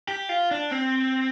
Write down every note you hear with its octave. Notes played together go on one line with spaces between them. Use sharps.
G4
F4
D4
C4